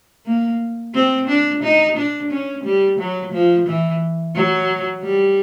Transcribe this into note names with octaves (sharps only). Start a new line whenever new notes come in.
A#3
C4
D4
D#4
D4
C#4
G3
F#3
F3
E3
F#3
G3